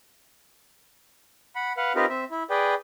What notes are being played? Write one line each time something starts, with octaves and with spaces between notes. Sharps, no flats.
F#5 B5
B4 F5 F#5
C4 D#4 F4 G4 A#4 B4
C4 E5
E4
G#4 B4 D5 G5